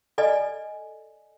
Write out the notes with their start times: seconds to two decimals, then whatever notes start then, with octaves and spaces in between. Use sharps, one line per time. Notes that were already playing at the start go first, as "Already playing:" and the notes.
0.18 A4 D5 D#5 G#5